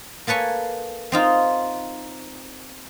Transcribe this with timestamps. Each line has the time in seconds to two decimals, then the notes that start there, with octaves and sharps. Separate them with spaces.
0.27 A#3 A4 B4 C#5 G#5
1.12 C4 D#4 F4